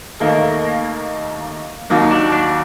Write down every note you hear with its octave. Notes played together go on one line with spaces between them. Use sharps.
D#2 D#3 A3 A#3 D#4 A4
D#2 D#3 F#3 A#3
D4
D4